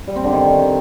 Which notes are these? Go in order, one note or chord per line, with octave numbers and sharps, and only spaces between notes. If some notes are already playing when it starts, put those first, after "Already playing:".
G3
C4
D3
D#3